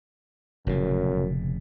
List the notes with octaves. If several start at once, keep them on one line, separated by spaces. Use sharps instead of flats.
F1 F#2 A#2 C#3